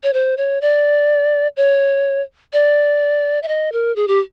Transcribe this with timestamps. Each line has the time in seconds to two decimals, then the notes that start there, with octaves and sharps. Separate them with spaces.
0.03 C#5
0.13 C5
0.37 C#5
0.61 D5
1.57 C#5
2.53 D5
3.43 E5
3.48 D#5
3.73 A#4
3.96 G#4
4.08 G4